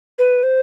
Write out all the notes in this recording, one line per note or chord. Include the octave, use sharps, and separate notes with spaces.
B4
C5